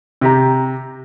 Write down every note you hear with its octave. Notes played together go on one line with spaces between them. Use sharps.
C3 G4 A#5